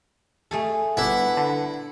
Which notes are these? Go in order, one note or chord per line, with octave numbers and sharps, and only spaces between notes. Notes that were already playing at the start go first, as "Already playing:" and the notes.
A3 G#4 A4
G1 D4 E4 B4 F#5
D3